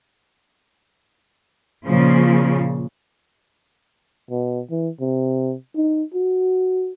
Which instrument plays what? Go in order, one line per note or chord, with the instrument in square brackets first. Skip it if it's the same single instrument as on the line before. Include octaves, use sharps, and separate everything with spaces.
[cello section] A#2 C#3 F3 C#4
[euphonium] B2
E3
C3
D#4
F#4